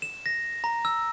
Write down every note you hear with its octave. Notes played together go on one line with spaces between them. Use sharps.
E7
A#6
A#5
E6